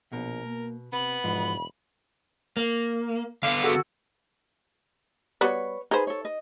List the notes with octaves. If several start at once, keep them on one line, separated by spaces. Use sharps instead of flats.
A#1 B2 A#4
A#3
C3 B3 B5
E1 G#2 F3
A#3
D3 B3 F5
F#4 G#4 A4
G3 B3 F#4 B4 C#5
D#4 G#4 B4 C5
A4 C#5
D#5